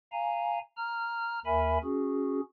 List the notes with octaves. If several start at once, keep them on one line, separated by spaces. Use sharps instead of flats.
F5 G#5 A#5
A#5 F6
D#2 A#4 E5 G#5 B5
C#4 F#4 G#4